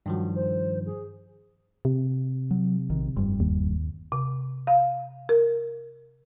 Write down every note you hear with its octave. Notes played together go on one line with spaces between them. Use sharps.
G2 D#3 F3 F#3
C5
G#4
C3
F#3
A#1 D#3
F1 G2 G3
D#2
C3
F5
A#4